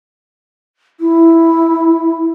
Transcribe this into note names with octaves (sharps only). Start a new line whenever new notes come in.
E4